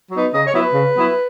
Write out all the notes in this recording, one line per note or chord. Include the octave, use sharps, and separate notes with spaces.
F#3 B3 D#4
C#3 D#5
C#5
F#3 B3 E4
B4
C#3
F#3 B3 E4